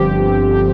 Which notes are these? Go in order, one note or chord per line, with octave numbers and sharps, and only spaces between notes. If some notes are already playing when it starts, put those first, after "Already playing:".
Already playing: G1 G2 D3 F3 C4 G4